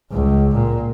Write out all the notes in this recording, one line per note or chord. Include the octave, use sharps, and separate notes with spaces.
C#2
A#2